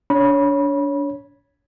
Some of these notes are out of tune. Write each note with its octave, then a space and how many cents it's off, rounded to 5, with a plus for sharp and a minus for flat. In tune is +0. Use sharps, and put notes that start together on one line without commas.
D4 -30 C#5 +0 B5 -25